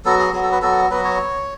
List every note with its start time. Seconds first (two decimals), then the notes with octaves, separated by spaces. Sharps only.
0.05 F#3 B3 F#4 A4
0.19 G#4
0.33 F#3 B3 F#4 G#4
0.43 A4
0.52 B4
0.62 F#3 B3 F#4 A4
0.90 F#3 B3 F#4 B4
1.05 C#5